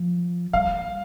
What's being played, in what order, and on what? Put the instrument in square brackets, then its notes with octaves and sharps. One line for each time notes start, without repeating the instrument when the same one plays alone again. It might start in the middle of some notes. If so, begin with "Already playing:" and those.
Already playing: [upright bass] F3
[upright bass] G3 [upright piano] F5